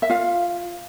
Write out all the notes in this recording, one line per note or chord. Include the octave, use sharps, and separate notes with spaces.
E5
F4 F5